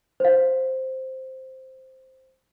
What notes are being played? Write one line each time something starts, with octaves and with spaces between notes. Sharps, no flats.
C5 F5